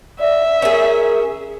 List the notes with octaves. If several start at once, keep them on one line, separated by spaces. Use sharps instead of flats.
D5 E5
C#4 G#4 A#4